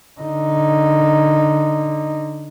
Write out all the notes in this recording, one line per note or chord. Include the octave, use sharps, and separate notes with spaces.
D3 D#4